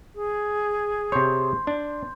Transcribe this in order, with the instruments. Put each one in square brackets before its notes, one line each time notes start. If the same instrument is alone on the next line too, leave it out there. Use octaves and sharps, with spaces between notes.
[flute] G#4
[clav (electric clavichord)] C3 C#5 [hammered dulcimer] C5
[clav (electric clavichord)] D4